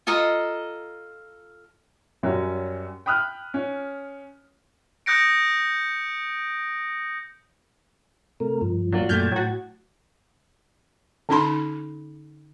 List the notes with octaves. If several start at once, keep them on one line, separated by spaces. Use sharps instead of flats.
F4 A4 D#5 A#5
F#2 G3 C#4 F#4
G5 B5 D#6 F6 F#6
C#4
D#6 F#6 G6 A#6 C#7 D7
C3 A3 A#4
G2 F3
F#3 A#3 D4 F4 F#4
F#2 A#2 A3 G5 A5 F6 G6 G#6
A2 F#3 F#4
D3 C#4 D#4 B5 C6